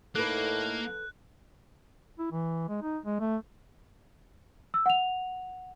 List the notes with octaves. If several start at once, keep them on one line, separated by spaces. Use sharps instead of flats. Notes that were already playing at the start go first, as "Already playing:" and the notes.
A2 A#3 D#4 A4 B4 F#6
E4
E3
G#3
D#4
G#3
A3
E6
F#5 F7